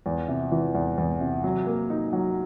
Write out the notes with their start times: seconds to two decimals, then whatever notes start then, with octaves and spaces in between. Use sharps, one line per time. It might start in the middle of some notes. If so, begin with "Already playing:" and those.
0.06 E2
0.28 C3
0.52 E3
0.75 E2
0.98 E2
1.21 C3
1.44 F#3
1.67 A#3
1.90 D#4
2.13 F#3